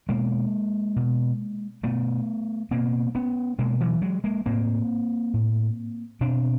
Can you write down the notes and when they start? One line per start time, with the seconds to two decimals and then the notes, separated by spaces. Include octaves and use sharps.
0.09 B2 G#3 A#3
0.96 B2
1.84 B2 A3 B3
2.71 B2 A#3 C4
3.15 B3 C#4
3.59 B2 G#3 A#3
3.80 E3 F#3
4.02 F#3 G#3
4.24 G#3 A#3
4.46 A2 A#3 C4
5.34 A2
6.21 B2 C4 D4